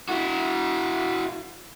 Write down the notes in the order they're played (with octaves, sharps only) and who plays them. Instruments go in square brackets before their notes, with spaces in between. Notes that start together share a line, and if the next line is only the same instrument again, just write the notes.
[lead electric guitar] E4 F#4